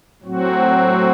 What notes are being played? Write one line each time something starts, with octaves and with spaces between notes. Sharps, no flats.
A2 F#3 C4 F#4